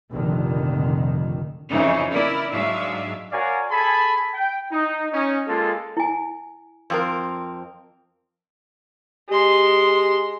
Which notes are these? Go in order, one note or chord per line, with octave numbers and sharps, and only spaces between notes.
F1 A#1 D3 D#3
F2 C#3 E3 D#4
E4 A#4 D5
G#2 F#3 G#3 D4 E5 F5
F#4 A#4 C#5 D5 F5 G#5
G#4 A4 G#5 A5 B5
G5
D#4
C#4 D#4
G#3 A#3 F4 G#4 A4
E4 G#5
F2 C4 A#4
G#3 G4 C6